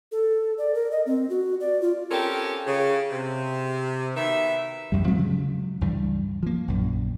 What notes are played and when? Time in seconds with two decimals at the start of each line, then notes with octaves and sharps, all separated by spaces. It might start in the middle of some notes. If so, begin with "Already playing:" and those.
0.12 A4
0.58 D5
0.74 A#4
0.91 D#5
1.06 C4
1.30 F#4
1.60 D5
1.82 F4
2.11 C4 C#4 F4 G4 A4 A#4
2.66 C#3
3.11 C3
4.16 B2 D#3 B4 E5
4.92 A1 F#2 G3
5.05 C3 F3 G#3 C4
5.18 C#3 F3 F#3 G#3
5.81 C#2 G2 E3 G3
6.43 F3 A#3
6.68 A#1 F#2